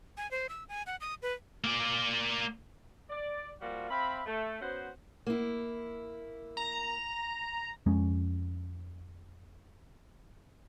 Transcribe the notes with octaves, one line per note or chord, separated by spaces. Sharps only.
G#5
C5
E6
G#5
F#5
D#6
B4
A#3 D5
D5
F3 G3 A#3 F4 F#4
C4 E5 F5 B5
A3
B3 C#4 F#4 C5
A#3 E4
A#5
F2 G#3 C#4